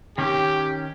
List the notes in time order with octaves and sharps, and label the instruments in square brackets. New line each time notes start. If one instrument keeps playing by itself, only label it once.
[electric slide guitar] D#3 C#4 [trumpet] G4